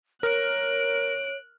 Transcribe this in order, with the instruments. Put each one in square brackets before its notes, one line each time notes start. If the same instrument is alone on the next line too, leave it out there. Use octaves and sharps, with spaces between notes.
[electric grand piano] A#4 F6 [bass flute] C#5 [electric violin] F#6 D7